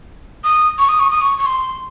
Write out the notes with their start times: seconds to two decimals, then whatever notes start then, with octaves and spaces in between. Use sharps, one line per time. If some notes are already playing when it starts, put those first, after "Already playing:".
0.44 D#6
0.78 C#6
0.89 D#6
1.00 C#6
1.11 D#6
1.21 C#6
1.38 C#6
1.46 C6